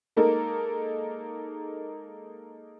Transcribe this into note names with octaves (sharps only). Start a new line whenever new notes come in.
G#3 A#3 D#4 A4 A#4